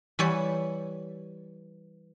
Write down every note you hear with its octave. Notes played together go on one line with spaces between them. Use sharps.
E3 G3 C#5